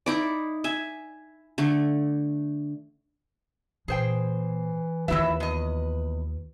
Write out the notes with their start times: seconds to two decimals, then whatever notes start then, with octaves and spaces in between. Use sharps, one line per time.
0.06 D#4 E4 D5
0.64 E5 G#5
1.58 D3 A3
3.88 A#2 E3 G#4 C5 G5
5.08 D#2 E3 E4 F4 B4 E5
5.40 E2 D#5